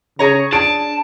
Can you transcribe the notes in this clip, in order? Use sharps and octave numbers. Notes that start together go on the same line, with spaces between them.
C#3 G#4 C#5 A#5
D4 G#4 A5 D7